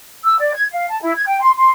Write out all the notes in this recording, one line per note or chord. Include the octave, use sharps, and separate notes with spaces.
E6
D5
G#6
F5
A5
E4
G#6
G5
C6
C6